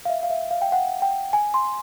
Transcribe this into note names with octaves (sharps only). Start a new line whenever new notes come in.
F5
E5
F5
E5
F5
G5
F#5
G5
G#5
C6